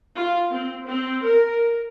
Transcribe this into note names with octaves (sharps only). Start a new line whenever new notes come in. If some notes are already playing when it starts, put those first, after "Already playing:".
F4
C4
C4
A#4